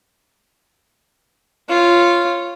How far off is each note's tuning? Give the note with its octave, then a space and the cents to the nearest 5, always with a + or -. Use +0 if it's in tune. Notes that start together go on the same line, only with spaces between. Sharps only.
F4 -10 C#5 -15